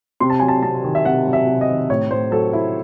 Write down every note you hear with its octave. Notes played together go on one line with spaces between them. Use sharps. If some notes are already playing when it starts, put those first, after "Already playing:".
C3 C6
A5
F#3 G#5
A5
C3 A5
D#3
E5
C3 F#5
F#3
E5
C3
D#5
D#3
A2 C#5
A2 C5
F#3 A4
F#3 E4